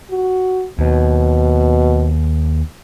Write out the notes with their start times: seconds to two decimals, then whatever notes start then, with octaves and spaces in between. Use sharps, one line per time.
0.10 F#4
0.79 D#2 B2